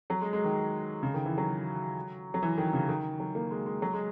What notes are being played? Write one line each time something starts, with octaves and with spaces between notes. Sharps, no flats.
F#3
G#3
G#3
D#3
C#3
D#3
E3
F#3
F#3
E3
D#3
C#3
D#3
F#3
A#3
G#3
G#3
F#3
G#3